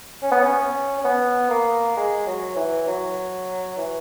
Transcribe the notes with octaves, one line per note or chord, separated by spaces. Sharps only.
C#4
B3
C#4
C#4
B3
A#3
G#3
F#3
E3
F#3
E3